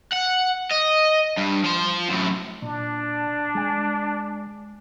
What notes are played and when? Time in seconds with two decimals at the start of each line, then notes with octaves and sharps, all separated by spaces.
0.12 F#5
0.71 D#5
1.37 G2
1.64 F3 C5
2.09 F#2 A2
2.62 A#2 D4
3.55 G#3 G#5